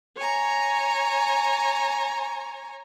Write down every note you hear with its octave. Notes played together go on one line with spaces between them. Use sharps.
C#5 G#5 A#5